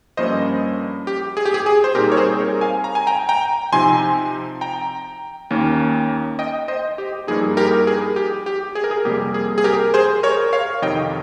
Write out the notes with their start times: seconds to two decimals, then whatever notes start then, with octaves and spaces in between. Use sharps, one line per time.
0.17 G2 F3 A#3 C#4 C5 D#5
1.07 G4
1.37 G#4
1.45 G4
1.54 G#4
1.66 G#4
1.84 C5
1.95 A#2 G3 C4 D#4 G4 A#4
2.12 C#5
2.17 G#4 C5
2.40 A#4 C#5
2.61 F5 G#5
2.84 A#5
2.95 G#5
3.07 G5 A#5
3.29 G5 A#5
3.72 C3 F3 C4 D#4 G#5 C6
4.61 G5 A#5
5.50 D#2 D#3 A#3 C#4
6.39 D#5 G5
6.68 C5 D#5
6.98 G4
7.27 G2 F3 A#3 D#4 G#4
7.57 G4 A#4
7.87 G#4
8.16 G4
8.46 G4
8.75 G#4
8.84 A#4
8.91 G#4
9.05 F2 C3 G3 A#3 G4
9.34 G#4
9.58 G#4
9.64 G4 A#4
9.94 G#4 C5
10.23 A#4 C#5
10.53 C#5 F5
10.82 F2 C3 D#3 D#5 G5